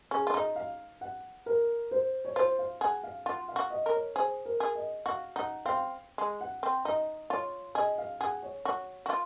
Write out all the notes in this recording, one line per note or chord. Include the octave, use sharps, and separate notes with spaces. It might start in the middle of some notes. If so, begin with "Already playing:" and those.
C#4 G#4
F4
D#4 D#5
F5
F#5
A#4
C5
C#5
F4 C5
F5
G#4 F#5
F5
F4 F#5
F5
F#4
D#5
A#4
C#5
G#4 C5
A#4
G#4
D#5
F#4 F5
D#4 F#5
C4 F5
G#3
F#5
C4
D#4 D#5
F4 C#5
G#4 D#5
F5
G#4 F#5
C#5
F#4 C#5
F#4
F4